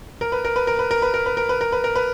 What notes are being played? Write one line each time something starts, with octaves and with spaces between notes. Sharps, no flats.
A#4
B4
A#4
B4
A#4
B4
A#4
B4
A#4
B4
A#4
B4
A#4
B4
A#4
B4